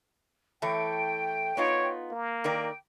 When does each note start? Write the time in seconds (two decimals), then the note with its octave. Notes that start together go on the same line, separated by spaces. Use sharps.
0.62 E3 A3 C#5 G5
1.57 B3 D#4 F4 C#5
2.11 A#3
2.44 D#3 A#4 D5 G5